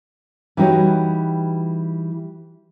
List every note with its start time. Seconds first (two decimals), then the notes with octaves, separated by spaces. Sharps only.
0.57 E3 G3 D#4 F#4 C#5